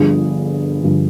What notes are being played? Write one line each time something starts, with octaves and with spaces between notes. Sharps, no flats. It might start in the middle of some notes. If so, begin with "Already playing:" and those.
Already playing: G1 G2 D3 F3 G#4
G1 G2 D3 F3